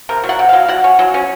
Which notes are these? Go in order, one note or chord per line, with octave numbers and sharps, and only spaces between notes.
C3 A#4
F#3
F#5
C3
F#3 F5
F#3 F#5
C#4
F#3
C#4